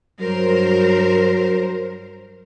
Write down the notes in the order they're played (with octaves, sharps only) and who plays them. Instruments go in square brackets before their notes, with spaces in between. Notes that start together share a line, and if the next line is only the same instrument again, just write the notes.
[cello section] G2 A#4 C5 [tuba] F#3